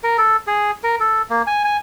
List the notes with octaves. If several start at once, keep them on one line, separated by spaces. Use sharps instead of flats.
A#4
A4
G#4
A#4
A4
A#3
G#5
G#5